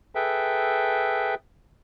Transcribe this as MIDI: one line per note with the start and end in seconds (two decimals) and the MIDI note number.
0.15 1.35 68
0.15 1.35 69
0.15 1.35 71
0.15 1.35 76
0.15 1.35 79